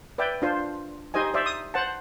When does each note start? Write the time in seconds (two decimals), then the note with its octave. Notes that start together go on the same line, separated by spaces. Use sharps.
0.18 B4 D5 E5 G5
0.42 D4 F4 C5
1.14 D#4 G4 C5 D#5 G#5
1.34 C5 D5 E5
1.46 D#6
1.74 C5 F#5 A5